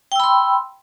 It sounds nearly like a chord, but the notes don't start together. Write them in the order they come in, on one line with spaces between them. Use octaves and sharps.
G5 E6 B5 C6